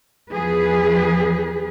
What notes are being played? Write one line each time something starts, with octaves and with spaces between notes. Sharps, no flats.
E2 F3 G#4 B4